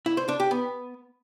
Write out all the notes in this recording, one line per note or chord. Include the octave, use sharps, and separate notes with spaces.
E4
C5
D4
G4
B3